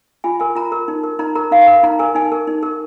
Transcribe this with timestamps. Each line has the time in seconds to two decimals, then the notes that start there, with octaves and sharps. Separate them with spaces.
0.24 F4 G#5
0.40 A#4 G#5
0.55 F4 A#5
0.72 A#4
0.88 D#4
1.04 A#4
1.19 D#4 A#5
1.35 A#4 A#5
1.51 D#4 F5
1.62 F5
1.67 A#4
1.73 F5
1.83 D#4 A#5
1.99 A#4 G#5
2.15 D#4 G#5
2.32 A#4
2.47 D#4
2.63 A#4